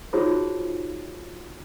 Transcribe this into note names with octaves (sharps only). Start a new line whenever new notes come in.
D#4 F4 F#4 G#4 C5 C#5